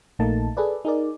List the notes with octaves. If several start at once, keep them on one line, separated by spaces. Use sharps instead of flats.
A#1 A#2 A3 A#3 D#4 A5
G#4 A4 B4 D5
D#4 G#4 A#4 D5